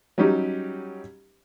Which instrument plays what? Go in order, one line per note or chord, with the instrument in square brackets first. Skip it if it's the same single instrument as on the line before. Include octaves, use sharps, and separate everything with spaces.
[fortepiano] F#3 G3 C#4 D#4 G4